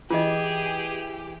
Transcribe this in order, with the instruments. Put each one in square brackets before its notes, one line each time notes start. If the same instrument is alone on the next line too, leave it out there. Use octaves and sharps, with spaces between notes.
[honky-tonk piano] E3 [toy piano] F4 D#5 [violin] G4 [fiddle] G#4